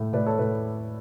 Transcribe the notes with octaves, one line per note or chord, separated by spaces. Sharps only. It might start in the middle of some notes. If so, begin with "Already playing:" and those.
Already playing: A2 A3
A2 B4 D5
A4 C#5
A2 B4